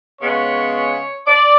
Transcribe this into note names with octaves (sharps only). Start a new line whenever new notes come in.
C#3 G#3 B3 C#5
D5